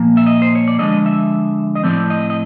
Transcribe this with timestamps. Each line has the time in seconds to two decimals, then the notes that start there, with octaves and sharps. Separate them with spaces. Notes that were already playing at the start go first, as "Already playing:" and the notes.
Already playing: A#2 F3 A#3
0.17 E5
0.27 D#5
0.42 C5
0.55 C#5
0.68 D5
0.79 D3 F3 G#3 D#5
1.06 E5
1.75 D#5
1.84 A2 F3 A3 C4 D5
2.10 D#5
2.30 D#5